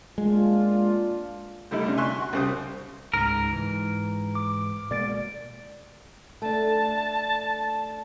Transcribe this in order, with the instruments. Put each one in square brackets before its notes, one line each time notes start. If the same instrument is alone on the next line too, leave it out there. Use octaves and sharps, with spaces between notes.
[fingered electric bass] G#3 [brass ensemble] A#3 D4 F4
[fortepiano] D3 G3 A3 D#4 E4
C3 C#4 D4
E5 G#5 C6 C#6 F#6
F#4 C#6
C2 C#3 G3 C5 G5 D#6
[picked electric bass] C#2 G#2 [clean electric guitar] A#4
[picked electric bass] G#2 E3
[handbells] D6
[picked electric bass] B2 G#3 A#3 [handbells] D5 A6 D7
[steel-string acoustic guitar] A3 D4 [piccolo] A5